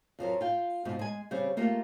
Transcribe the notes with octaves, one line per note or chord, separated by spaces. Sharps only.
F2 F3 F#3 A#4
F4 G5
F2 G#2 B2 F3
G#3 G#5
C#3 G3 C4 C#4
A3 A#3 F4 G4 A4 A#4